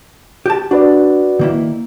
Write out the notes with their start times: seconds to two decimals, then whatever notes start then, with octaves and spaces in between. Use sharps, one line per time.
0.46 G4 A5
0.71 D4 F#4 B4 D5
1.39 D#3 A#3 E4